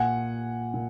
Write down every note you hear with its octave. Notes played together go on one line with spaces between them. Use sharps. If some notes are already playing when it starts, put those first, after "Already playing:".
Already playing: A#2 F#5 G#5
A#2